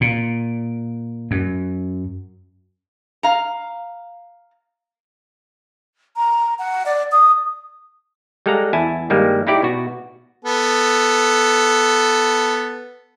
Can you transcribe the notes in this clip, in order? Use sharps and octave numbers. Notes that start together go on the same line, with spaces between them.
A#2
F#2
F5 A#5
A#5
F#5
D5
D#6
G3 G#3 A4 F5 F#5 A#5
E2 E4 G#5 A5
G2 D#3 G3 G#3 A#3
D#4 E4 G4 D5
B2 F#4
B3 A4